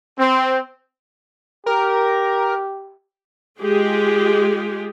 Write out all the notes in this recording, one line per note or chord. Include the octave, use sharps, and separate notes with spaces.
C4
G4 A#4
G#3 F4 G4 G#4